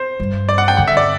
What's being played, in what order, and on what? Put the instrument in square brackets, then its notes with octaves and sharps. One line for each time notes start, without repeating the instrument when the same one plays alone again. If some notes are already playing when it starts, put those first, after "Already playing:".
Already playing: [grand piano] C5
[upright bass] G2
[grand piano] D5
F#5
G5
[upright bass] D3 [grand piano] F#5
[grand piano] E5
D5